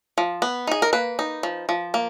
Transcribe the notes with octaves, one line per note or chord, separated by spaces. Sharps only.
F3
B3
D#4 G#4
A#4
A#3 B4
D#4
F3
F3
A#3